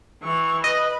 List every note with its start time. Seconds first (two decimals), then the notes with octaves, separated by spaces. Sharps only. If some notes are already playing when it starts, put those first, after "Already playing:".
0.23 E3 C#6
0.64 B4 D#5